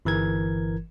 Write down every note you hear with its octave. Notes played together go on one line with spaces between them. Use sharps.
G1 E3 A#4 G#6